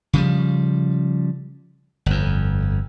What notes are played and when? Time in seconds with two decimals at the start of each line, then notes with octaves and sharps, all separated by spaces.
0.13 C#3 F3 G3
2.06 G1 F2